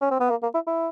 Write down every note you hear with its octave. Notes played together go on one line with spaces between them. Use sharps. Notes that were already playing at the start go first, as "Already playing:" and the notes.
C#4
C4
B3
A#3
A#3
E4
E4